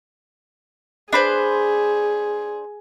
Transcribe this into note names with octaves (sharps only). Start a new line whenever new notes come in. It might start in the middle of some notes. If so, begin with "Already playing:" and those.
D4 G#4 B4 C5